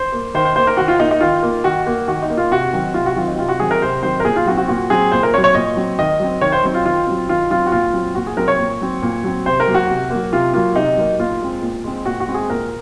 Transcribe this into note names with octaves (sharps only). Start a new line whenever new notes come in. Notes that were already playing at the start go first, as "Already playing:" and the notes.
Already playing: C5
A#3
D#3 C5
C5
A#3 C5
A#4
D#3 F#4
F4
A#3 D#4
D#4
D#3 F4
A#3
D#3 F#4
A#3
D#3 F#4
D#4
A#3
F4
C3 F#4
D#3 F#3 C4
C3 F4
F#4
D#3 F#3 C4 F4
D#4
C3 F4
F#4
D#3 F#3 C4 G#4
A#4
C3 C5
D#3 F#3 C4 C5
A#4
A#2 G#4
F4
F#3 F#4
C4
F#4
A#2 F#4
F#3 C4 G#4
A#2 C5
A#4
F#3 C4 C#5
C#5
A#2 D#5
F#3 C4
D#3 D#5
F#3 C4
D#3 C#5
C5
F#3 C4 D#4
F4
D#3 F4
F#3 C4
D#3 F4
F#3 C4 F4
F#4
A#2 F4
F#3 C4
A#2 F#4
G#4
F#3 C4 A#4
C#5
A#2
F#3 C4
A#2
F#3 C4
C3 C5
A#4
F#3 A#3
F#4
C3
F#3 A#3
C3 F4
F#3 A#3 F4
C3 D#4
F#3 A#3
A#2 F4
G#3 C4
A#2
G#3 C4
A#2 F#4
F#4
G#3 C4
G#4
A#2 A#4